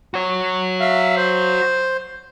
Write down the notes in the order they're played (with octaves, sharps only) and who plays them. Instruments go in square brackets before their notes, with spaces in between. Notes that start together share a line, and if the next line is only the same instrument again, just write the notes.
[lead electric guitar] F#4 C#5
[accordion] E5 F5
C5